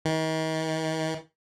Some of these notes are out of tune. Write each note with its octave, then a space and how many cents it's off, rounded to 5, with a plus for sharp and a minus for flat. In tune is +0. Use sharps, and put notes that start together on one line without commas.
D#3 +40